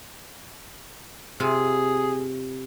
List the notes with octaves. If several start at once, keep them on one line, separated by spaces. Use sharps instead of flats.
C3 F4 G#4 F5